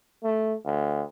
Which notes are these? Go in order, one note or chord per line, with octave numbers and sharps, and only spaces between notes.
A3
D2